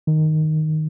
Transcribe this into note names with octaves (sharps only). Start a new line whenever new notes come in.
D#3